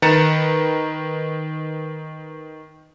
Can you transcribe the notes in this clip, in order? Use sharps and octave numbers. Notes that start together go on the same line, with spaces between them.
D#3 B4 A#5 A6 C#7 E7